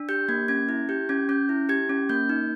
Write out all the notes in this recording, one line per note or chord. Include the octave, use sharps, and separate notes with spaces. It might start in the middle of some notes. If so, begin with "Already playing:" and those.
Already playing: D4
G4 G6
A#3 G#6
C#4 G#6
E4 G#6
G4 G6
C#4 G#6
C#4 G6
E4
G4 G#6
C#4
A#3 G6
D#4